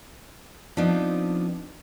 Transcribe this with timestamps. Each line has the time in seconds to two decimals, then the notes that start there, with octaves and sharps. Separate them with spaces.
0.77 F3 B3 C4 D4 D#4